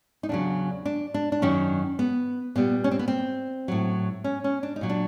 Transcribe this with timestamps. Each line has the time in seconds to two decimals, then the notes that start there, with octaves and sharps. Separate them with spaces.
0.23 D#4
0.29 E2 C#3 F#3 D4
0.85 D4
1.14 D4
1.32 D4
1.42 F#2 D#3 F#3 C#4
1.99 B3
2.55 A#2 G3 B3
2.84 C#4
2.91 C4
2.99 B3
3.08 C4
3.68 A2 F#3
4.24 C#4
4.44 C#4
4.63 D4
4.76 D#4
4.81 A#2 F#3
4.89 D4